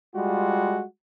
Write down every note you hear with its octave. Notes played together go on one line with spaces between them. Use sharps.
G3 G#3 F4 F#4